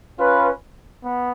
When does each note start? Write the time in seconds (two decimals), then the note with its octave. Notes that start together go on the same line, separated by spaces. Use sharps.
0.18 C#4 F4 B4
1.03 B3